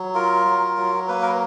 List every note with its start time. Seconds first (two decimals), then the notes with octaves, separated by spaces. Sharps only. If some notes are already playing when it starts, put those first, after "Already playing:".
Already playing: F#3
0.14 F4 A#4
0.46 F#3
0.78 F#3
1.08 A#3 B4
1.22 A#4